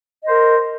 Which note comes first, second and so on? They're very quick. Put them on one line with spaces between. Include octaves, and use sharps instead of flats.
D#5 C5 A#4